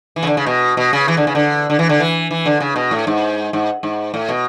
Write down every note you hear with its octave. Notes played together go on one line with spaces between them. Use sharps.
E3
C#3
D3
C#3
B2
B2
C#3
E3
D3
C#3
D3
D3
E3
D3
E3
E3
D3
C#3
B2
A2
G#2
G#2
G#2
A2
B2